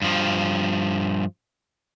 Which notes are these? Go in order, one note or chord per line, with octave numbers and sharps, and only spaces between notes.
G2 F3